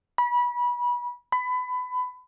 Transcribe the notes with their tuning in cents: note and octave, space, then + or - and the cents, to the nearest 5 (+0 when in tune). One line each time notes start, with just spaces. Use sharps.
B5 -25
B5 +25